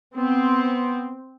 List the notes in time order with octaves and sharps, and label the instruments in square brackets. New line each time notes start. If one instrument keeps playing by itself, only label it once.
[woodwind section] B3 [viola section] C4